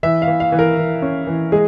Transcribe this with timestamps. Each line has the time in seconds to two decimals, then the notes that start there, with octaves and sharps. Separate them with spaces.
0.03 E3 E5
0.22 F5
0.28 E3
0.40 F5
0.52 E3
0.59 A#4
0.77 E3
1.02 C#4
1.27 E3
1.52 G#3 G#4